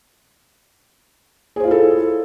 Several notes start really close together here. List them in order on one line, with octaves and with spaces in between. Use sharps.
G#4 C5 F4 E4 A4